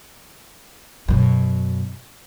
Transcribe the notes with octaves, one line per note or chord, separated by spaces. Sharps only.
F#2 B2